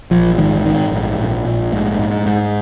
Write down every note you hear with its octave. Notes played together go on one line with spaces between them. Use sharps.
A#1 F3
G#2 D#3
G#2 D#3
A#1
A#1
A#1
G#2
G#2
G#2